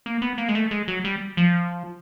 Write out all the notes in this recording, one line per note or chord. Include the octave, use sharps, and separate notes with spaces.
A#3
B3
A#3
G#3
A3
G#3
F#3
G3
F3